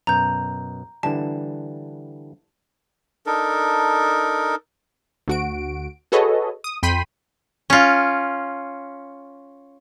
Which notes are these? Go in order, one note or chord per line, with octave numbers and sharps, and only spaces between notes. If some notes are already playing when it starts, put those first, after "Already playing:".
F#2 B2 A#5 G6
D3 E3 G3 A5
D4 D#4 A4 A#4
D2 F#4 D7
F#4 G#4 A4 B4 C#5 D#5
D#6
F2 G5 B5 C6 B6 D#7
C#4 F4